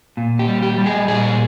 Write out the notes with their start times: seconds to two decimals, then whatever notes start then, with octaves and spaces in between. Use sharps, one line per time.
0.17 A#2
0.39 G4
0.48 G3
0.63 G4
0.78 G3
0.86 G#4
1.08 A#2 G#4